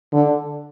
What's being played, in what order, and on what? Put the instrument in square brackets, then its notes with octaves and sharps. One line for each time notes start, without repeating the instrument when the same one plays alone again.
[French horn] D3